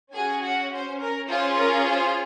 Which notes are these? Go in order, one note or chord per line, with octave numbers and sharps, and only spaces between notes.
C#4 F#4 G#4 G#5
F#4 F#5
C5
A#4
C#4 F4 G#4 C5
A#4
C5